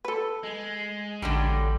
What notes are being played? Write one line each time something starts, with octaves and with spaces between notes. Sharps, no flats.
A4 B4
G#3
A1 D3 F#3 G3